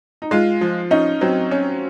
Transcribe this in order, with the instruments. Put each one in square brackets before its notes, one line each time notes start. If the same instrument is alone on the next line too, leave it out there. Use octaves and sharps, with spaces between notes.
[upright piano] D#4
[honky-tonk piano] G#3 [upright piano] F4
[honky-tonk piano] F3
[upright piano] C#4 [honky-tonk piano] D#4
[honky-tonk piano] F#3 [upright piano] C4
[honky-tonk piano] C#4